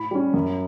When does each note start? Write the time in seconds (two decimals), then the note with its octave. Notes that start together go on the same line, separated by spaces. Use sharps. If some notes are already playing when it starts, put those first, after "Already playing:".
Already playing: A2 B5
0.11 G3 C#4
0.34 F#2